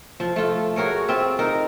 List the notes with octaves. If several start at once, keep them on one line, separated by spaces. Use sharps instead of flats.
F3
A3 F4
F#4 G#4 A#4 C#5
C4 F4 E5
D#4 A#4